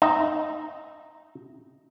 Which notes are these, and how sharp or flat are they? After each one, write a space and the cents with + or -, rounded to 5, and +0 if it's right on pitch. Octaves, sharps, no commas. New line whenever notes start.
D#4 -10 E5 +0 A#5 +0